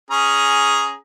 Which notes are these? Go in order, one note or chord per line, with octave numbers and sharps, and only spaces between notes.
C#4 G#4 A#5